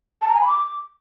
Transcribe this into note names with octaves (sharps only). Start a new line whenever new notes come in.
A5
A#5
G#5
B5
D6